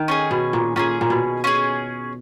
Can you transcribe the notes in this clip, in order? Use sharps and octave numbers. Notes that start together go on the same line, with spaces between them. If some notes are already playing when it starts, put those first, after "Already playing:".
Already playing: D#3
C#4 F4 G#4
B2
A#2
A#2 C#4 F4 G#4
A#2
B2
C#4 F4 G#4